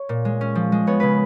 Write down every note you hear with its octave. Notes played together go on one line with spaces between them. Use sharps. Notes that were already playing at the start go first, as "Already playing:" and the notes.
Already playing: C#5
A#2
G#3
C#4
F3
G#3
B3 C#5
C#3 B4